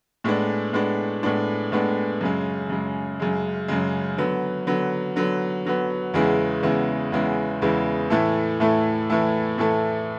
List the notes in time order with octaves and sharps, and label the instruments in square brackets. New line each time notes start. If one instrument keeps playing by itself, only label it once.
[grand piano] A2 G#3 B3 D4
A2 G#3 B3 D4
A2 G#3 B3 D4
A2 G#3 B3 D4
F#2 C#3 G#3
F#2 C#3 G#3
F#2 C#3 G#3
F#2 C#3 G#3
D3 F#3 B3
D3 F#3 B3
D3 F#3 B3
D3 F#3 B3
E2 C#3 G#3 B3 E4
E2 C#3 G#3 B3 E4
E2 C#3 G#3 B3 E4
E2 C#3 G#3 B3 E4
A2 E3 A3 E4 A4
A2 E3 A3 E4 A4
A2 E3 A3 E4 A4
A2 E3 A3 E4 A4